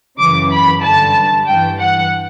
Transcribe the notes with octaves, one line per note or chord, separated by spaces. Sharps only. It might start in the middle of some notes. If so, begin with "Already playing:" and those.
F#2 C#3 E3 D6
B5
G2 D3 A5
G2 E3 G5
F#5